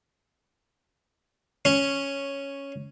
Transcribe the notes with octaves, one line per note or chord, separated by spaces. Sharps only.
C#4